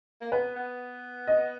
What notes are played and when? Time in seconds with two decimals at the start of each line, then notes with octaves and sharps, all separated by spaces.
0.21 A#3
0.32 B3 B4
0.56 B3
1.27 D#5